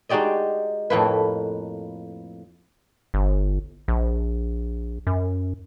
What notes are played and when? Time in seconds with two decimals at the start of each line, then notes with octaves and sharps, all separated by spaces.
0.09 G#3 D#4 F#4 G4 D5 D#5
0.90 F2 A2 A#3 B4
3.14 G1
3.88 A#1
5.07 F#2